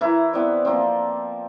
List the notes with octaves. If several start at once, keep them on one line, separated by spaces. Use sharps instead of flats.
E3 E4 A#4
B3 C4 E4 D5
F3 A#3 C4